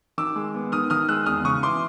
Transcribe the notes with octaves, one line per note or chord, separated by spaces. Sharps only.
D#3 D6 E6
G#3
B3
D#3 D#6 F6
D#3 D#6 F6
G#3 E6 F#6
E2 D#6 F6
C#3 C#6 D#6
E3 C6 D6